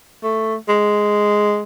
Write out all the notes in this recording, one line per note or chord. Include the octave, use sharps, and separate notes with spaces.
A3
G#3